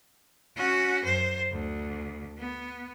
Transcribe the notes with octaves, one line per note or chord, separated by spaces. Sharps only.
C#4 F#4
F#2 C5
D2
B3